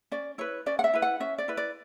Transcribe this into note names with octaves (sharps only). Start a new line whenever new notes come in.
C#4 D5
E4 B4 C#5
C#4 D5
F#5
E5
E4 B4
F#5
C#4 E5
D5
E4 B4
D5